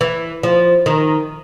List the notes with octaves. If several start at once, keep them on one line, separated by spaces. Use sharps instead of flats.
E3
F3
D#3